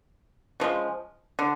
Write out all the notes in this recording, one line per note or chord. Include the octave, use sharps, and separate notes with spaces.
C#3 F3 G#3
D3